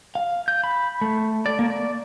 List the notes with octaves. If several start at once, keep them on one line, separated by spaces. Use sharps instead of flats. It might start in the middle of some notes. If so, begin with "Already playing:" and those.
F5
G6
B5
A3
D5
A#3
D5